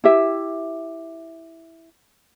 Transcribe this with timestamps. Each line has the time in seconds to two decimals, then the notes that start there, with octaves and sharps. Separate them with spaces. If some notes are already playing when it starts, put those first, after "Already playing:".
0.04 E4 G4 E5